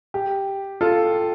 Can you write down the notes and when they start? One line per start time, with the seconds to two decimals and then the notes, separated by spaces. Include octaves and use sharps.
0.14 G4
0.81 F4 A4